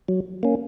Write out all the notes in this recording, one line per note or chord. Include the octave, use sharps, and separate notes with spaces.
F#3
A#3 C#4